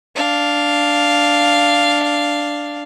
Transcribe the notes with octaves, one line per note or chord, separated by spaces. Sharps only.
D4 F5